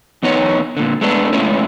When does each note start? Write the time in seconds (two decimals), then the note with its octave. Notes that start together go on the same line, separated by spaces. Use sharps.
0.23 E2 B3 D#4 C#5
0.77 A#2 D3
1.01 G#3 A3 B3 D4
1.33 A2 G#3 C#4 E4